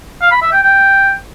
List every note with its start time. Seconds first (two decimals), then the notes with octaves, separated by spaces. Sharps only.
0.22 F5
0.32 B5
0.42 E5
0.53 G5
0.63 G5